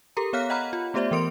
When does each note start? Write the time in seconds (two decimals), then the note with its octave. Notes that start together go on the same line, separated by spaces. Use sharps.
0.17 G4 A4 A#4 A#5
0.33 B3 C#5 F5 F6 F#6 B6
0.50 D#5 F#5 A#5 B5 F6
0.73 F4
0.94 A3 B3 G4 C5 D5 E5
1.11 E3 B3 A#4 C6 D7